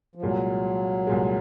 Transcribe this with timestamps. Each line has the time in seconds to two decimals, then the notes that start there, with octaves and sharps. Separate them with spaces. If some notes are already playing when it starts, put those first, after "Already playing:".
0.15 F3
0.22 C2 A#2 F#3 G#3
1.07 C2 A#2 G#3